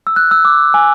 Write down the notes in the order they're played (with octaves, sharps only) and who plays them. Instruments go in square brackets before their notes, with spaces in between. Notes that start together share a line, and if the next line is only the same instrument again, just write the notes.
[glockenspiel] E6
F#6
E6
D6
G#5